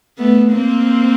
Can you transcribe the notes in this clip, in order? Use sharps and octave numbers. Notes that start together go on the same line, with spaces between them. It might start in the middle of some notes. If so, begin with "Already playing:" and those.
A3 B3
A#3 C4